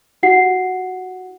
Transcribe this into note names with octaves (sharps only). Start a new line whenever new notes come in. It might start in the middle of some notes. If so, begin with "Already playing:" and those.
E4 F#4 G4 F#5 C7